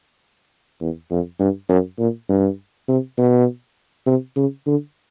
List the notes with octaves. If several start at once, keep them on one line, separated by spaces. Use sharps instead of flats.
E2
F2
G2
F#2
A#2
G2
C3
B2
C3
C#3
D3